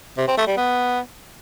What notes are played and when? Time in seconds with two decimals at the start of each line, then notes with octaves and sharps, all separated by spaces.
0.18 C3
0.28 C4
0.37 A3
0.47 G3
0.57 B3